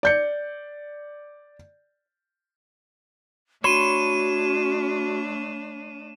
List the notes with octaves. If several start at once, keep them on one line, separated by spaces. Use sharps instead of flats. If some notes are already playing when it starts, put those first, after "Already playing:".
D5 G6 C#7
A3 D4 F#4 C#5 B5 C6 D#7 E7